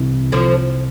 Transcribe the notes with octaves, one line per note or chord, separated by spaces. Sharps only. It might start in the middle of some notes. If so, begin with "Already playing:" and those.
Already playing: C2 C3 E3
D3 F3